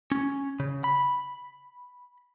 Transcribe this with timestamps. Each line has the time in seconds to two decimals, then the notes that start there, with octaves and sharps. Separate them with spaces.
0.12 C#4
0.60 C#3
0.84 B5